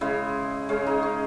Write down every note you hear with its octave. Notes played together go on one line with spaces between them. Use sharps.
C#3 G#3 E4
C#3 G#3 C#4
D#4
C#4